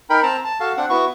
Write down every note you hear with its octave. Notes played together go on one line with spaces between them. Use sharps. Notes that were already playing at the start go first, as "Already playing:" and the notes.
D#4 A#4 G5 B5
C4 A5 A#5
A5
F#4 A4 F5 A5
C4 D4 F#5
B3 E4 F#4 C#6